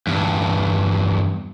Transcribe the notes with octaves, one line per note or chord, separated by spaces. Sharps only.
E2 G2